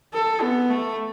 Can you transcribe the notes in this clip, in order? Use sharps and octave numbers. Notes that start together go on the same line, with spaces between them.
A4
B3
A3